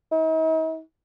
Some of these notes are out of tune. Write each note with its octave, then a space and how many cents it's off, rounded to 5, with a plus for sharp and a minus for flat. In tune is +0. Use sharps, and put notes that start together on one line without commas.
D#4 +45